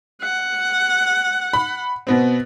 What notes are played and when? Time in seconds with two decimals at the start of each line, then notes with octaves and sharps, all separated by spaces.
0.22 F#5
1.53 B5
2.07 B2 B3 C4